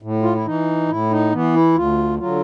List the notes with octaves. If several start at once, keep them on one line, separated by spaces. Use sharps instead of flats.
A2
F4
E4
E3 D#4
A2 E4
D#4
E3 B3
E4
D2 F4
D3 F#3 F4